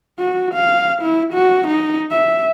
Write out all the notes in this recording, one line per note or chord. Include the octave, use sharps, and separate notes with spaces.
F#4
F5
E4
F#4
D#4
E5